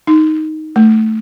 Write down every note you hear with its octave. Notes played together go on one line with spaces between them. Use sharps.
D#4
A3